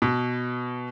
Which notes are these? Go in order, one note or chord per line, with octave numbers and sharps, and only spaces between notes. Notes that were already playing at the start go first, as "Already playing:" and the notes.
B2